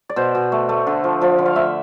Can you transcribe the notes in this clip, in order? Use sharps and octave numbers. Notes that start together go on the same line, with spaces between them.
D5
B2 C5
B2
A3
A3
D3
F3
F3 D5
D3
F5
A3 E5